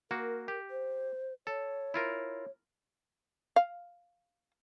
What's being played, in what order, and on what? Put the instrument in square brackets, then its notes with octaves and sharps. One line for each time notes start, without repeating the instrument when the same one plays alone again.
[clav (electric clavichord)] A#3 F#4 [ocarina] A#4
[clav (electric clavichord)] G4
[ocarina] C5
[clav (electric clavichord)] A4 [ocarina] C#5
[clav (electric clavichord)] E4 F4 A#4
[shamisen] F5